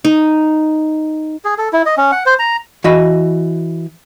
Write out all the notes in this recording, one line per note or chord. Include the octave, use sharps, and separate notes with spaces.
D#4
G#4
A4
E4
D#5
C#4
F#5
C5
A#5
E3 F#4 D#5 B5